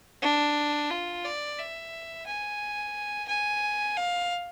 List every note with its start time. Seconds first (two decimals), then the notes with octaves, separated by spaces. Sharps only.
0.22 D4
0.90 F4
1.25 D5
1.59 E5
2.26 G#5
3.28 G#5
3.97 F5